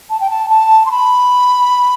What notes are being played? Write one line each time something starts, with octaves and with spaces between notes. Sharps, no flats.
A5
G5
A5
A5
C6
B5